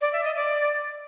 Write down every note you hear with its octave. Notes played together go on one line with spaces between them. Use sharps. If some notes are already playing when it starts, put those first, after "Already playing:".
D5
E5
D#5
D5